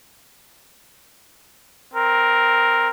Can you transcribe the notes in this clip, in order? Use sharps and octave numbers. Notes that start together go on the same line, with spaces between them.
C4 A#4